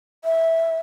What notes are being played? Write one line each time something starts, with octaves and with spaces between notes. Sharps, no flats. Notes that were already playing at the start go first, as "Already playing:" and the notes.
E5